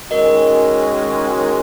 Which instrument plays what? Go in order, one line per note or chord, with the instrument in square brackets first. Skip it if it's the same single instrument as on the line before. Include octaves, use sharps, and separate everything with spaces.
[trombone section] D#3 G#3 C#4 F#4 [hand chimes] A#4 D#5